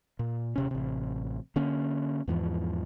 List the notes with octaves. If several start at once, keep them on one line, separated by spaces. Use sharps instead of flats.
A#2
D#1 C3 C#4
A1 C3
D3 A#3 C#4
E2 G#2 E3 F3